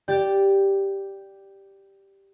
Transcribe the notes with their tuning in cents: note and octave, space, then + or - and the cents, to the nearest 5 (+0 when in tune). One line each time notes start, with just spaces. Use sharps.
G4 +0 D5 +0